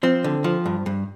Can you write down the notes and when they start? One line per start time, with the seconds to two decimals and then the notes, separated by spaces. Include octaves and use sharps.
0.03 F3 C4
0.24 D3
0.44 F3
0.66 G2
0.86 G2